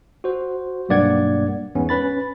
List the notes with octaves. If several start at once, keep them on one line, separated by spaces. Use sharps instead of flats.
F#4 C5
B1 G2 A#3 D5 F#5 G#6
E2 G#2 B3 C#4
C#4 B4 B5 A6